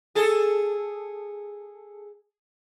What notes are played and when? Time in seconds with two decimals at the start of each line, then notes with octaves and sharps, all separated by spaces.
0.15 G#4 A4